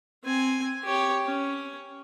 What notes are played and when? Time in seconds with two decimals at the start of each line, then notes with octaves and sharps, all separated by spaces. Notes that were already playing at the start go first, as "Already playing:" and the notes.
0.24 C4 G#5
0.84 G4 C#5
1.25 C#4